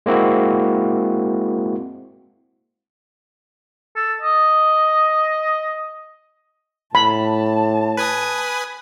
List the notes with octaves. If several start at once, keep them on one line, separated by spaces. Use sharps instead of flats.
G#3 A#3 C4 E4 F#4
A4
D#5
A2 A5 B5
B4 G#5 D#6